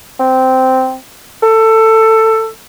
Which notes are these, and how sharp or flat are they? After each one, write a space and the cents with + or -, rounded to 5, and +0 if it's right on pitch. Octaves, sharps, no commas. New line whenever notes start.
C4 -10
A4 +15